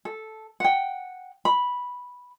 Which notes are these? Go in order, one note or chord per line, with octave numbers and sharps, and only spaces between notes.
A4
F#5 G5
B5